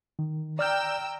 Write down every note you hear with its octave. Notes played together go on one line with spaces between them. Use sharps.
D#3
D5 G5 A#5 E6 F6 G6